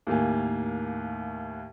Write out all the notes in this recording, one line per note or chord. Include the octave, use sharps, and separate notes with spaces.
D#2 A2 A#3 F5 G#5